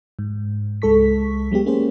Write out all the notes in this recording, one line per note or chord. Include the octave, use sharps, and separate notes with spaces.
G#2
C#2 G#3 A4 C#6 B6
F#3 G#3 B3 G4
A#3 C#4 G4 G#4 C5